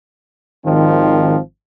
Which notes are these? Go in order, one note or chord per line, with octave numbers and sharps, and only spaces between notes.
G#1 D#3 F3 C4